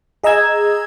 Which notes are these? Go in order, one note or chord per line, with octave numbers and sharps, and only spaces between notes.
G#4 D#5 A#5 E6 G#6